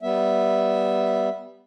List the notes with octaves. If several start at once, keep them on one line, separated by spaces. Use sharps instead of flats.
G3 B3 E5